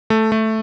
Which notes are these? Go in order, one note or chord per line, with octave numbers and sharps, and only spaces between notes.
A3
A3